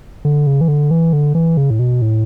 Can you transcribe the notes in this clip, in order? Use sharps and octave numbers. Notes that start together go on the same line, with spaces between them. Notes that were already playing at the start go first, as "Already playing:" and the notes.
D3
C#3
E3
D3
E3
D3
E3
C#3
A2
B2
A2